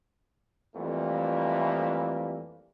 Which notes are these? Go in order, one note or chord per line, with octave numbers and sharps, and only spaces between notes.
F2 E3 G3 A3 A#3